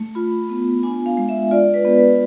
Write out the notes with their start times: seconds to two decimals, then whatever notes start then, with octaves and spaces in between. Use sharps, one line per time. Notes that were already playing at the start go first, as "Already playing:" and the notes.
Already playing: A3
0.15 F4 B5
0.50 B3
0.83 D4 G#5
1.06 F5
1.17 G#3
1.29 E5
1.51 F4 D5
1.74 B4
1.85 B3
1.96 B4